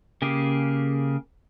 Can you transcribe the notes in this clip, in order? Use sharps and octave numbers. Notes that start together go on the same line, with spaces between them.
C#3 A#3 G4 G#4